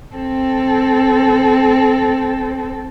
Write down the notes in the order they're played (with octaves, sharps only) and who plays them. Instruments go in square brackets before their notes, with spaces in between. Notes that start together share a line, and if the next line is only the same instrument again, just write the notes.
[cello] C4 A4